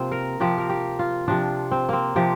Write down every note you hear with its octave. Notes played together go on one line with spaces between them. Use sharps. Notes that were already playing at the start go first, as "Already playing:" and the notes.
Already playing: C3 F3 A#3 C4
A#4
C3 F3 G4
A#4
G4
F4
C3 F3 D4
C4
A#3 C4
C3 F3 G4